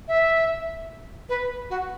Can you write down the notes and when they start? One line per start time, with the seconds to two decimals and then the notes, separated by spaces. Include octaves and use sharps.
0.08 E5
1.29 B4
1.70 F#4